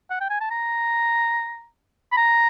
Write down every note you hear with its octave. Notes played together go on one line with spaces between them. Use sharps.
F#5
G5
G#5
A5
A#5
B5
A#5